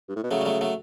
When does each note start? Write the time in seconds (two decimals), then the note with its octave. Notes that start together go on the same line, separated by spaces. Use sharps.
0.08 G2
0.16 A2
0.24 B2
0.31 C#3 F#3 A3
0.41 G3
0.45 F#3 A3
0.61 F#3 A3